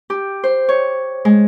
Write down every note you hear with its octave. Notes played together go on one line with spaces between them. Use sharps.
G4
C5
C#5
G#3